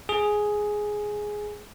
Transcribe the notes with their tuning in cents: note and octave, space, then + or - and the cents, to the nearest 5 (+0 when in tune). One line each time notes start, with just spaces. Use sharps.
G#4 +5